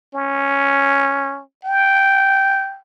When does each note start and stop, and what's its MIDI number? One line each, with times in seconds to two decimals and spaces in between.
0.14 1.42 61
1.65 2.78 79